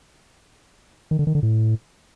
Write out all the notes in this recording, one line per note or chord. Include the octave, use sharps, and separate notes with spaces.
D#3
D3
D#3
D3
A2